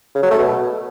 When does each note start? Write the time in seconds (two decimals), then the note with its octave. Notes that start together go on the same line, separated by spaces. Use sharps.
0.15 C#3
0.23 F#3
0.31 A3
0.39 B2